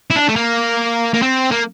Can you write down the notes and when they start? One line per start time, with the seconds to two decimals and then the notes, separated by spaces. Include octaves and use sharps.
0.10 E4
0.16 D4
0.29 A3
0.36 A#3
1.14 A#3
1.22 C4
1.52 A#3